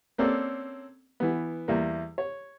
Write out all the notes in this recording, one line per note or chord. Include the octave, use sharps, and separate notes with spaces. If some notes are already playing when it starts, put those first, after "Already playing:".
A#3 C4 C#4 A4 D5
E3 B3
E2 G3 A#3
C#5